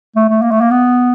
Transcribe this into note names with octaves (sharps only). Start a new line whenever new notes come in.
A3
A3
A#3
A3
A#3
B3